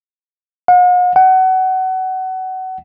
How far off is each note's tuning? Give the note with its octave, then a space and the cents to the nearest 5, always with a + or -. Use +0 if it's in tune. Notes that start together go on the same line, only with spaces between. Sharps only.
F#5 -45
F#5 +25